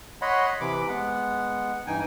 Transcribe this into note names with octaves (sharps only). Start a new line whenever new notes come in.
C#5 D#5 F#5 B5 C6
C3 E3 B5 D6
G#3 B3 F#5
G2 E3 D#4 G5 G#5